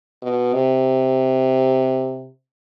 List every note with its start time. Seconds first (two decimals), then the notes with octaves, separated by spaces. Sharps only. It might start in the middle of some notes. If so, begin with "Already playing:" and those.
0.22 B2
0.54 C3